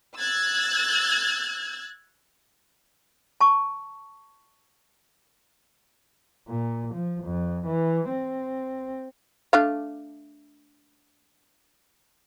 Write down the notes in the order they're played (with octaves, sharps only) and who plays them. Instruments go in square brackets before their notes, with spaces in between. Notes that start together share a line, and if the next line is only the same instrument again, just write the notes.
[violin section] E6 F#6 G#6 A6
[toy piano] A5 C#6
[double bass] A#2
F3
F2
E3
C4
[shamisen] A3 D4 F5